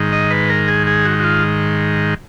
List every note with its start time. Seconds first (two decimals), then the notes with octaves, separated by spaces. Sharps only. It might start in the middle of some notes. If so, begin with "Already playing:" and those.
Already playing: G#2 D#3
0.12 D#5
0.31 B4
0.50 A#4
0.68 G#4
0.87 G#4
1.05 F#4
1.20 F#4
1.24 F4